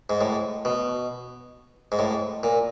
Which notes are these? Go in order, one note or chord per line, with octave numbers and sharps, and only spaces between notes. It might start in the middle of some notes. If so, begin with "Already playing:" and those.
G#2
A2
B2
G#2
A2
A#2